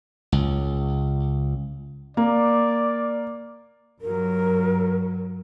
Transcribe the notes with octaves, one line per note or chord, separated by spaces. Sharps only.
C#2
A#3 D5
G2 F#3 A#4